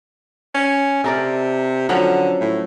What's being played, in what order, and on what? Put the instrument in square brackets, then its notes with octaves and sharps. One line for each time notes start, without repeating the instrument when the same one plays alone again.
[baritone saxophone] C#4
[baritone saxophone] C3 [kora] A4 A#4 D5
[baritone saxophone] D3 [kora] F3 F#3 C#4
[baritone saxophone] A2